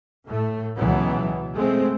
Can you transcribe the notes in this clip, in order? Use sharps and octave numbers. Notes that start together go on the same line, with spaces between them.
A2 A3
C#2 B2 E3 F#3 B3
G#3 A3 C4